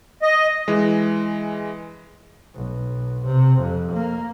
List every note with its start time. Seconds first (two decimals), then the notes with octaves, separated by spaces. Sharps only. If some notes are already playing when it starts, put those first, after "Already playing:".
0.22 D#5
0.68 E3 G#3
2.55 B1
3.26 C3
3.61 F2
3.92 A#3